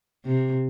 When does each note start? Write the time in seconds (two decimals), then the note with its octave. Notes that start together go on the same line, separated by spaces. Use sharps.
0.25 C3